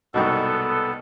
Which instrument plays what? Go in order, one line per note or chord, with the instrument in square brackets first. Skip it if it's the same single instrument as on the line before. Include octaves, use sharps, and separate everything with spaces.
[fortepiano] C2 G#2 B2 [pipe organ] B3 A4